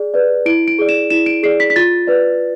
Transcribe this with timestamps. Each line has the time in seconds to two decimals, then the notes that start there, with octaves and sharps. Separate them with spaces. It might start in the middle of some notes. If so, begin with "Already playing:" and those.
Already playing: G#4 D5
0.14 B4 D5
0.46 E4 D7
0.68 D7
0.78 G#4 D5
0.89 E7
1.10 E4 E7
1.26 D7
1.43 G#4 D5 C7
1.60 B6
1.70 B6
1.76 F4 A6
2.07 B4 D5